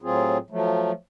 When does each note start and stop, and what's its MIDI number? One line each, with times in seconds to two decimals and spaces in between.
0.02 0.38 45
0.02 0.38 54
0.02 0.38 60
0.02 0.38 65
0.02 0.38 68
0.50 0.92 53
0.50 0.92 54
0.50 0.92 57